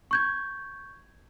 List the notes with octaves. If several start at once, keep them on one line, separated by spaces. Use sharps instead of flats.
C#6 G6 G#6